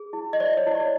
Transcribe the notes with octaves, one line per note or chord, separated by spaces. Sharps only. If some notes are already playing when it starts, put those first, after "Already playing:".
Already playing: G#4
E4
D#5
C5 D5
C#5
E4
D5